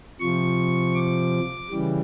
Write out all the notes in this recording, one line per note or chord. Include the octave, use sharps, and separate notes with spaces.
C3 F3 C#6
D6
C#3 E3 G3